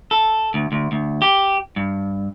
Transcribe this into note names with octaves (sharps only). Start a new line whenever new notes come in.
A4
D2
D2
D2
G4
G2